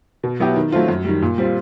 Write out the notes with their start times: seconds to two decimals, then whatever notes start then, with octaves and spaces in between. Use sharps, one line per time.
0.23 B2
0.40 F#3 B3 E4 G4
0.56 D#3
0.72 F#3 A3 C4 F4
0.88 F#2
1.05 D#3 G3
1.22 A#2
1.38 G3 C4 F4